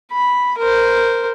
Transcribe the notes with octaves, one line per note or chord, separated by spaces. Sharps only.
B5
A#4 C5